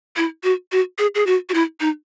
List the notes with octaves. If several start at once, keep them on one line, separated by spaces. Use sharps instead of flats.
E4
F#4
F#4
G#4
G#4
F#4
F#4
E4
D#4